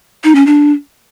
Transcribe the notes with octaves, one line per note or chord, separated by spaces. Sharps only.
D#4
C#4
D4